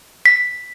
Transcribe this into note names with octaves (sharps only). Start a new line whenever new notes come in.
B6